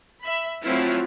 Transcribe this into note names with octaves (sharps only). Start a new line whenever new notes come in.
E5 B5
F3 F#3 A3 C4 E4 F4